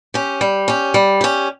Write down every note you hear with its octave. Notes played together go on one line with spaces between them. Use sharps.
C#4 G4
G3
C#4 G4
G3
C#4 G4